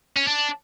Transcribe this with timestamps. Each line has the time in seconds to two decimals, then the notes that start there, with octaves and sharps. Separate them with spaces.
0.17 C#4
0.27 D4